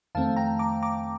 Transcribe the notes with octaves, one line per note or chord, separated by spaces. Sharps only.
F2 D#3 A3 C4 F5 A5
G5 A#5
A#5 D6
A#5 D6